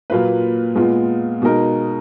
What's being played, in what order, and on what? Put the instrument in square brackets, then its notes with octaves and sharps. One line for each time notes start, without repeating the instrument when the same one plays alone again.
[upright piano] A#2 F#3 A#3 F4 B4
A#2 G#3 B3 F4
B2 G#3 D#4 A#4